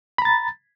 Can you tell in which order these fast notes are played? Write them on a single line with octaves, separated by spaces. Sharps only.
B5 A#5 A6